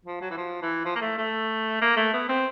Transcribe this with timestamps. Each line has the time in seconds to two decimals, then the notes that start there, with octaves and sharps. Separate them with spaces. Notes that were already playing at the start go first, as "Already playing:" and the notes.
0.05 F3
0.21 F#3
0.31 E3
0.37 F3
0.62 E3
0.86 F3
0.96 A#3
1.01 A3
1.18 A3
1.81 A#3
1.97 A3
2.14 B3
2.29 C4